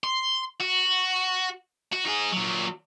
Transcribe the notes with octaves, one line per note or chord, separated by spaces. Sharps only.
C6
F#4
F#4
D#4 G#4
A#2 F#3